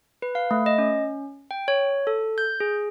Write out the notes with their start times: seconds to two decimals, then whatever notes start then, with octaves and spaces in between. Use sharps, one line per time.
0.22 B4
0.35 F5
0.51 A3
0.66 D#5
0.78 C#4
1.51 G5
1.68 C#5
2.07 A4
2.38 G6
2.60 G#4